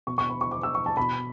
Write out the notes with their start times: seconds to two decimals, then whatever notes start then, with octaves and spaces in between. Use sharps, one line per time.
0.07 B2 C#6
0.18 C#6
0.30 B5
0.41 C#6
0.51 D6
0.63 E6
0.75 C#6
0.86 A5
0.97 B2 B5